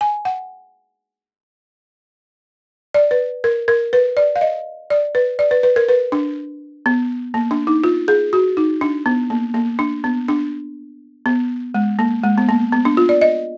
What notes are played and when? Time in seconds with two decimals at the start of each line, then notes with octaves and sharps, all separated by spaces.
0.01 G#5
0.25 F#5
2.94 D5
3.11 B4
3.44 A#4
3.68 A#4
3.93 B4
4.17 D5
4.36 F5
4.41 D#5
4.90 D5
5.15 B4
5.39 D5
5.51 B4
5.63 B4
5.76 A#4
5.89 B4
6.12 D4
6.86 B3
7.34 A#3
7.51 D4
7.67 D#4
7.84 F4
8.08 G#4
8.33 F#4
8.57 D#4
8.81 D4
9.06 B3
9.30 A#3
9.54 A#3
9.79 D4
10.04 B3
10.28 D4
11.26 B3
11.74 G#3
11.99 A#3
12.24 G#3
12.38 B3
12.49 A#3
12.72 B3
12.85 D4
12.97 F4
13.09 D5
13.21 D#5